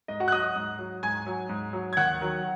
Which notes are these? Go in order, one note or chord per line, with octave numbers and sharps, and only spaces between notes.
G#2 D#5
F#4 F#5
F#6
F#3 D#5 D#6
G#2
F#3
G#2 G#5 G#6
F#3
G#2
F#3
G#6
D#2 F#5 F#6
D#3 F#3